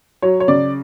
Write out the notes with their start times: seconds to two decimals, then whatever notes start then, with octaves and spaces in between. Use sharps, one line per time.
0.22 F#3 C#5
0.40 C#5
0.48 C#3 D5